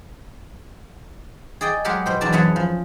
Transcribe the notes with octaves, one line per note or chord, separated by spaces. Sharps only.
G#4 D5 D#5 G5
F#3 G#3 G4 G#4 A#4 F#5
B2 C5 G5
E2 F#3 D4 D5 A5
F#2 E3 C#4 G#4 F#5 A5
F3